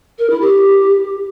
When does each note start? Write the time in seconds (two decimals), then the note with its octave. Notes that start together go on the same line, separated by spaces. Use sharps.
0.18 A#4
0.29 E4
0.41 G4